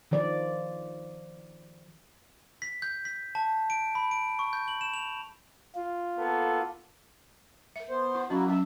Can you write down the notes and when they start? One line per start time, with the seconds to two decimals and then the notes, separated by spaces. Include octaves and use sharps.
0.11 D#3 F3 D5
2.62 B6
2.82 G6
3.05 B6
3.35 A5
3.70 D7
3.95 B5
4.11 D7
4.39 C#6
4.53 G6
4.68 F#7
4.81 E7
4.94 F7
5.75 F4
6.18 A#3 B3 A4
7.76 A#4 E5
7.90 B3 C5
8.15 E4
8.30 F#3 A#3 C#4 E4 F#4
8.48 F#3 C#4 E5